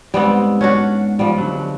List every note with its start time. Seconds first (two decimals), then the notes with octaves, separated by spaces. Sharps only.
0.14 G#2 G3 B3 C4
0.61 C#4 D4 F#4
1.19 F3 G3
1.38 D3 F#3